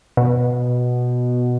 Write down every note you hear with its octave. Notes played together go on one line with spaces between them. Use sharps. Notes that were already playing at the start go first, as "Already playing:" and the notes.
B2